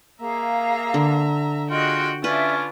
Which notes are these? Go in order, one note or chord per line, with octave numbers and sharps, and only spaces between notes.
A#3 G#4 E5 F5 A#5
D3
F4 F#4 G#4 D#5 G5 F#6
C#4 D4 F4 B4 D5 E5